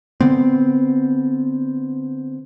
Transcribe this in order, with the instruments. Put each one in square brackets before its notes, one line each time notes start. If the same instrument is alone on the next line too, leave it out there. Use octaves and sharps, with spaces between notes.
[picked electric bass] D3 B3 C4